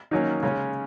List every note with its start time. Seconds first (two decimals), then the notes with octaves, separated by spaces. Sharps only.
0.11 D#3 F#3 A#3 C#4 D#4
0.43 C#3 G#3 C#4